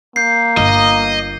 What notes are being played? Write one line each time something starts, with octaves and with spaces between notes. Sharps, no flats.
A#3 G6 C7
G1 D#5